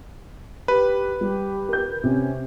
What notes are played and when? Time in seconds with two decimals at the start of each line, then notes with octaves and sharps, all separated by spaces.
0.68 G4 B4
1.21 G3 G4
1.69 A#4 G6
2.04 C3 C#4